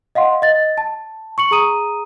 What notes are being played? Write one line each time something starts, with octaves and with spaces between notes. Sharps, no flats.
D#5 F5 F#5 C6
D#5 A6
A5
C#6 C#7 F#7
G#4 A#5 D#6 D#7